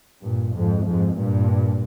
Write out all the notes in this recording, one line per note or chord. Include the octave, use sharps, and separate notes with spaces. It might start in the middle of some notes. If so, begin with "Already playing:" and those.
G2 A#2
F2 G#2
F2 G#2
G2 A#2